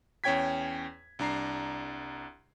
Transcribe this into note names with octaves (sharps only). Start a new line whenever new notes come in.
E2 C#4 C#5 G5 G#6 B6
C2 D4 A#5 C7